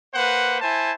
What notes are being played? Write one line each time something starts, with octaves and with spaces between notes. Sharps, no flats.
A#3 B4 C5 F#5
E4 C5 G#5 A5